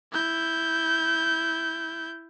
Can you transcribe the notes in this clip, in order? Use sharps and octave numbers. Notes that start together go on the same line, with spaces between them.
E4 G6